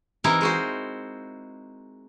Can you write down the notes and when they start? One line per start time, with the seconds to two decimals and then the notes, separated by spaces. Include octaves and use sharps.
0.24 E3 C4 D#4 E4 G4 A#4
0.41 G#3 F#4 C5